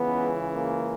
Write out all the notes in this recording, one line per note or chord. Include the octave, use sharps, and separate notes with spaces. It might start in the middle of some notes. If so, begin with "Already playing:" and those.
Already playing: C#2 C#3 E3 B3
A#3